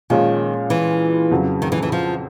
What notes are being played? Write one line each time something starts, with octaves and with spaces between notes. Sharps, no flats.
A#2 D#3 F3 G#3 C#4
E3
F2 C#3 F#3
D#3
E3
E3
F3